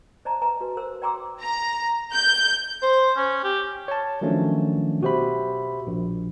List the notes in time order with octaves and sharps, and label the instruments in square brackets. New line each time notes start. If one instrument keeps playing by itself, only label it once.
[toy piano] C5 D5 D#5 A5 A#5
B4 D#5 G#5 A#5
F#4 B4
A#4 C5 E6
D5 G5 A#5 C6 D6 E6
[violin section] A#5
G6
[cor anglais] C5
C#4
G4
[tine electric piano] C#5 A5
D#3 F3 F#3 A3 C#4 D4
B2 F#4 G4 C5 E5 B5
A#1